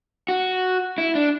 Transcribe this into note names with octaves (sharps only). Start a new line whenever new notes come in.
F#4
E4
D4